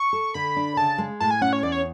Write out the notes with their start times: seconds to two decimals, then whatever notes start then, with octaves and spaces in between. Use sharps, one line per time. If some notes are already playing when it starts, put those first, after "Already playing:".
Already playing: C#6
0.13 A4
0.34 D3 B5
0.57 D4
0.77 C#3 A5
0.98 G#3
1.20 A2 A5
1.31 G#5
1.41 C#4 F#5
1.53 C#5
1.63 E2 D5
1.72 C#5